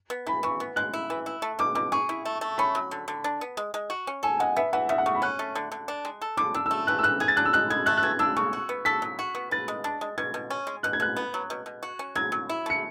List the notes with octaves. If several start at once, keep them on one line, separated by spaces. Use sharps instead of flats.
B3
E3 B5
E3 C#6
B3
G#3 F#6
E4
E3
E4
A3
B2 D6
B2 D6
G#4 C#6
E4
A3
A3
C#4 B5
F#3
D3
D3
D4
B3
G#3
G#3
F#4
C#4
A4 G#5
G#3 F#5
B3 E5
E3 F#5
C#3 E5
F#5
C#3 C#6
B5
C#4 F#6
A3
D3
D3
D4
G#3
A4
D3 D6
D4 E6
A3 E6
E3 F#6
E6
E3 F#6
G#4 G#6
A6
D4 F#6
E6
G#3 F#6
G#3 G#6
A3 F#6
F#6
E3 G#6
D4 E6
C#3 C#6
F#4
B3
A4 B6
F#3
F#4
B3
B4 A6
G#3
D4
G#3
B2 G#6
B2
C#4
G#3
B2 F#6
G#6
B2 F#6
B3
F#3
B2
B2
F#4
C#4
F#3 G#6
F#3
E4
A3 C#7